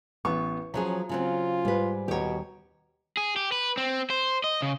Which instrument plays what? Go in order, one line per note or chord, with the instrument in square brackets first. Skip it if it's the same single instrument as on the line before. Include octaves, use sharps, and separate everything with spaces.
[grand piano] A1 C#6 [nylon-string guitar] B3
[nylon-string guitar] F3 F#3 G#4 [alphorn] C#4 [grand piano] A#5
[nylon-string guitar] C#3 F#3 C4 [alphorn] F4
[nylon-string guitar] G#2 B4 [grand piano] G3
[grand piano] D#1 A#5 [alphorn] B2 [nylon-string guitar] G4 C#5
[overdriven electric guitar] G#4
G4
B4
C4
C5
D#5
C#3